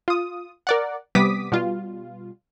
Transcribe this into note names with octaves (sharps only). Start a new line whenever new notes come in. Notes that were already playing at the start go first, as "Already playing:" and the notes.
F4 D#6
A#4 D5 F#5
C3 G3 B3 D6 D#6 B6
B2 G3 F4